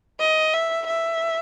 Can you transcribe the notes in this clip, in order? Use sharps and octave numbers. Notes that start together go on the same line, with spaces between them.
D#5
E5
E5